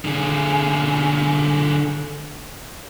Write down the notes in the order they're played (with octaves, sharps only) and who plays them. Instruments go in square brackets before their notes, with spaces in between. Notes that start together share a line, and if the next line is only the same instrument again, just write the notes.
[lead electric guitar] D3 G#4